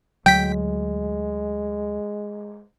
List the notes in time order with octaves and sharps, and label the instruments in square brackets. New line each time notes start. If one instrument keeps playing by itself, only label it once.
[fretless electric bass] D2 F#3 [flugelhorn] G#3 [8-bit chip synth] G5 B6